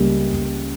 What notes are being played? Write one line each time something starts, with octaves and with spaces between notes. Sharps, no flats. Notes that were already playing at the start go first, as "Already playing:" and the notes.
Already playing: C#2 G3 A#3